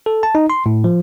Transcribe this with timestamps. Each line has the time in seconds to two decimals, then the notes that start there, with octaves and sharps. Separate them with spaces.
0.06 A4
0.23 A5
0.35 D#4
0.50 C6
0.66 A2
0.84 F3